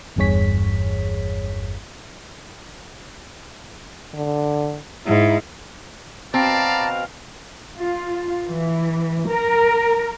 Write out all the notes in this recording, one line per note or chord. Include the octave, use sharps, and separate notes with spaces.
G1 E2 G2 G#4 C#5 B6
D3
G#2 E4
B2 C4 D5 F5 A5 A#5
F4
E3
A#4